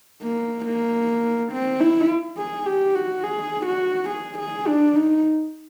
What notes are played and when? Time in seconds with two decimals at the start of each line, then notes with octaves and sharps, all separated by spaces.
0.22 A#3
0.65 A#3
1.52 C4
1.80 E4
2.37 G#4
2.66 G4
2.95 F#4
3.24 G#4
3.66 F#4
4.10 G#4
4.39 G#4
4.67 D4
4.95 D#4